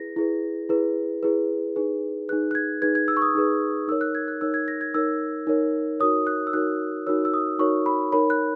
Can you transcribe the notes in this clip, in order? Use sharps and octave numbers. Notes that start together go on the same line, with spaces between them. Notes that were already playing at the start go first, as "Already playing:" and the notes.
Already playing: E4 G#4 B4 A#6
E4 G#4 B4
E4 G#4 B4
E4 G#4 B4
D#4 G#4 B4
D#4 G#4 B4 F#6
F#6
G#6
D#4 G#4 B4 G#6
G#6
E6
C#6
D#6
D#4 G#4 B4
D#4 A#4 C#5 E6
F#6
G#6
F#6
D#4 A#4 C#5 E6
G#6
A#6
G#6
D#4 A#4 C#5 E6
D#4 A#4 C#5
D#4 F#4 A#4 C#5 D#6
F#6
E6
D#4 F#4 A#4 C#5 F#6
D#4 F#4 A#4 C#5 E6
E6
D#6
D#4 F#4 A#4 C#5 C#6
B5
D#4 A#4 C#5 B5
F#6